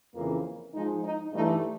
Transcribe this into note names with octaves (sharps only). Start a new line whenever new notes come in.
F2 C#3 E3 A#3
G#2 F3 G#3 D#4
D#4
G2 E3 A3 D#4